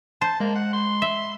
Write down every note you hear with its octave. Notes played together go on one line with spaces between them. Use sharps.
C5 A5
G#3 A#3
F#5
C6
E5